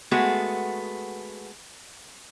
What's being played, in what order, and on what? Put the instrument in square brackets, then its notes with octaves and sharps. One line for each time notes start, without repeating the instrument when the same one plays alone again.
[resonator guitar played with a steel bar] G#3 A3 B3 F#4 G#4